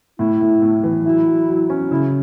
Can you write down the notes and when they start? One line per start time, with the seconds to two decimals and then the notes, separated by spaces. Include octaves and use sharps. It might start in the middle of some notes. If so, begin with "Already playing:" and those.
0.19 A2 E4
0.41 A2
0.62 A2
0.83 E3
1.05 F#3 E4
1.27 F#3
1.48 F#3
1.70 C#4
1.91 C#3 E4